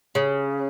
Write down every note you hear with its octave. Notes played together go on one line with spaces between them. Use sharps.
C#3